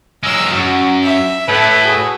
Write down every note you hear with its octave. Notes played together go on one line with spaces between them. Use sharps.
F#3 G#3 E6 F6
F#2 F#4
E5
A2 A3 E4 B4
F#4 G#4